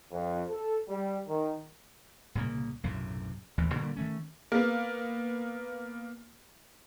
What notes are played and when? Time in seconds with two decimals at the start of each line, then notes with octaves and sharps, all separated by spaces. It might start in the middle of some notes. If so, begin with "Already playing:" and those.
0.11 F2
0.49 A4
0.89 G3
1.28 D#3
2.35 C2 A#2 C#3 A#3
2.83 B1 F#2 A2 C3
3.58 A1 D#2 E3
3.75 A#2 D3 G3 A#3
3.96 D#3 A3 C#4
4.52 A#3 B3